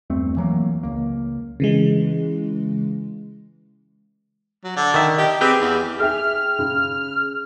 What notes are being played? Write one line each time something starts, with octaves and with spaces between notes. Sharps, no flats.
E2 G2 A3 C4
E3 F#3 G#3 A#3
C#2 A#3
C#3 E3 G#3
F#3
D3
D#3 E5
G4 D#5
C4 G4 G#4 B4 G5
E2
G#4 E5 G5 F6
C#3